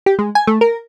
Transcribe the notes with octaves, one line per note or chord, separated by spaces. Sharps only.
G4
G#3
G#5
A3
A#4